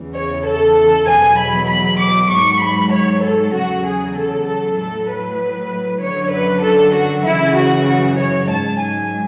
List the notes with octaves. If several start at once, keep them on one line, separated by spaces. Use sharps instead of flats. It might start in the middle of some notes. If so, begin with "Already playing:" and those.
Already playing: E2 C#3 E3
C#5
A4
E2 B2 F#3 G#5
B5
B5
D6
G#2 F#3 C#6
B5
C#5
A4
E2 C#3 F#3 F#4
G#4
A4
A4
A2 F#3 A4
B4
F#2 D3 F#3 C#5
B4
A4
F#4
F#2 C#3 E3 E4
F#4
F#4
C#5
G#2 F#3 A5
G#5